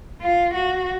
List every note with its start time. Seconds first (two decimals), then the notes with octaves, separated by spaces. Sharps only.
0.22 F4
0.54 F#4